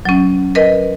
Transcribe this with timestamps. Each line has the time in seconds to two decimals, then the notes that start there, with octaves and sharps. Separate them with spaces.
0.05 F#3 C#4
0.55 A#4 B4 D#5